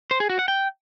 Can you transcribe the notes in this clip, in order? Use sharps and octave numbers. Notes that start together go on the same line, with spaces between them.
C5
G#4
F#4
F#5
G5